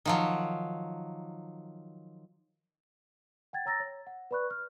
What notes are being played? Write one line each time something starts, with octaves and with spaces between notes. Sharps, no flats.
D#3 F3 F#3
F#5 G5 G#6 A6
C#5 A#5 E6 A6 A#6
C#5
F#5
B4 D5 B5 C#6 F#6
F6